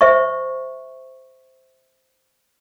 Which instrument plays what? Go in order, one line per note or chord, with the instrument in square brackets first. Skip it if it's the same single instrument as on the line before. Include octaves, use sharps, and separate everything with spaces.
[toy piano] C5 E5 C#6